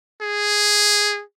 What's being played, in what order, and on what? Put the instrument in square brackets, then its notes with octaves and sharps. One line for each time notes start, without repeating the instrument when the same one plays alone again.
[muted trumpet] G#4